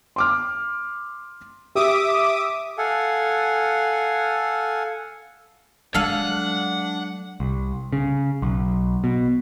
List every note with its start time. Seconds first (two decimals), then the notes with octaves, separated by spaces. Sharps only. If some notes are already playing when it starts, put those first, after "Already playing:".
0.16 C6 D6 F6
1.75 G4 E5 D6 D#6
2.78 A4 F5 F#5 G#5
5.94 F#3 G#3 D4 A4 F5 F#5 G#5
7.40 C2
7.93 C#3
8.42 B1
9.04 B2